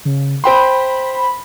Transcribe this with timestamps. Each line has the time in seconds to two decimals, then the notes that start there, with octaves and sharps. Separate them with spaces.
0.05 C#3
0.44 C5 G5 B5 C6